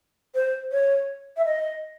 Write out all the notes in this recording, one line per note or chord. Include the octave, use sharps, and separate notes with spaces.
C5
C#5
E5
D#5